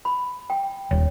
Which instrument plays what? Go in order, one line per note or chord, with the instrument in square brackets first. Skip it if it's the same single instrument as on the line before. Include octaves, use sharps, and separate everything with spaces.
[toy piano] B5
G5
[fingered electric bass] D#1 [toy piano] C#5